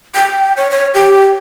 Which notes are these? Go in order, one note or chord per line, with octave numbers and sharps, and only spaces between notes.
G5
C#5
C#5
G4